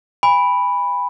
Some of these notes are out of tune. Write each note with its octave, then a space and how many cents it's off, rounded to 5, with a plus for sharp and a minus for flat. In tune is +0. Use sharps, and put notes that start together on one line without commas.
G#5 -35 B5 +0